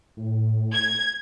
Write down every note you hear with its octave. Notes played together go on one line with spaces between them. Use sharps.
A2
G#6